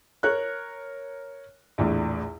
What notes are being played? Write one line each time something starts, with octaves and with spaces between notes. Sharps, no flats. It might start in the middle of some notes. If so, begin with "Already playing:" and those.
A#4 C#5 F#6
A#1 E2 A2